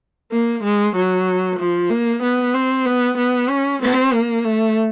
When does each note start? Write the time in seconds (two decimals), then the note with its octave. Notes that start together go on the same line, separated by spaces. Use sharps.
0.32 A#3
0.63 G#3
0.95 F#3
1.59 F3
1.90 A#3
2.23 B3
2.54 C4
2.86 B3
3.17 B3
3.50 C#4
3.82 C4
4.13 A#3
4.45 A3